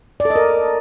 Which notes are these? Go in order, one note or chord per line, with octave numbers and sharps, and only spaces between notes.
D5
A4
D#5
A#4